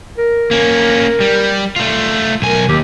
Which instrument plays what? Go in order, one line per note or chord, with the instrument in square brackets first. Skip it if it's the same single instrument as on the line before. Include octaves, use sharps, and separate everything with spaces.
[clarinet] A#4
[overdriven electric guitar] A#3 C#4
G3
A3 F4
[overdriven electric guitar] B1 G#5 [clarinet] A#4
[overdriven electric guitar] D#2 [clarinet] G4